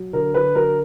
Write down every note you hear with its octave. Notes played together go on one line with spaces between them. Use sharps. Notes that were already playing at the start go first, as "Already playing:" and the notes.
Already playing: F#3
D3 A#4
D3 B4
F#3 A#4